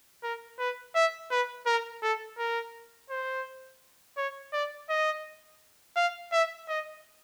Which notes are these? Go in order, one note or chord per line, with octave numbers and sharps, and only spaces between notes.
A#4
B4
E5
B4
A#4
A4
A#4
C5
C#5
D5
D#5
F5
E5
D#5